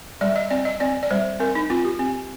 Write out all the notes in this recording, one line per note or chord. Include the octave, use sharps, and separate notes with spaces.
G3 D5
D#5
C4 D5
D#5
C4 D5
D5
G3 C5
C4 A#4
D#4
C4 F4
G4
C4